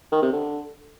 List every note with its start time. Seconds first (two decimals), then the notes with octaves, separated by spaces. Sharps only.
0.12 D#3
0.22 C3
0.33 D3